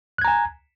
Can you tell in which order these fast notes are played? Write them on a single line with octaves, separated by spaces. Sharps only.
F#6 G#6 A#5 G#5